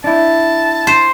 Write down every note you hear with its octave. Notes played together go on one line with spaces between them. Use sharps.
D4 E4 A5
C5